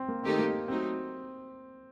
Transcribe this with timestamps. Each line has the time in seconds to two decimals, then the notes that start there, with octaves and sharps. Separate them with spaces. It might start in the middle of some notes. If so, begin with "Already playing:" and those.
Already playing: C4
0.08 A#3
0.23 D#3 A3 C4 D#4 G4
0.39 A#3
0.68 F#3 A3 C4 D#4